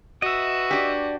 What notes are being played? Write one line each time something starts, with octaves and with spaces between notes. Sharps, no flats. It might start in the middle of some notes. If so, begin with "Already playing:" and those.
F#4 B4 D#5 E5
D4 G4